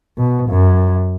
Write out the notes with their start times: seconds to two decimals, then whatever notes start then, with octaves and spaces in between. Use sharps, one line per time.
0.18 B2
0.49 F#2